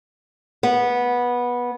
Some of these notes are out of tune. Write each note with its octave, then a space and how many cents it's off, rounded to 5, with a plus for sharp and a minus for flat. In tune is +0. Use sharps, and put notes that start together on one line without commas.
B3 -15